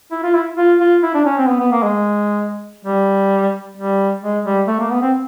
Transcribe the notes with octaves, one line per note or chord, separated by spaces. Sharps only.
E4
F4
E4
F4
F4
E4
D4
C#4
C4
B3
B3
A#3
G#3
G3
G3
G#3
G3
A3
A#3
B3
C4